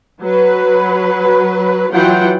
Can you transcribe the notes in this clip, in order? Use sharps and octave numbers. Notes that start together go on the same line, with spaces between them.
F#3 B4
E3 F#3 F4 F#5 G5